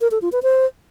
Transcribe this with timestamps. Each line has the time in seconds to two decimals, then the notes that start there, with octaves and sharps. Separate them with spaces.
0.01 A#4
0.11 A4
0.22 F4
0.32 B4
0.43 C5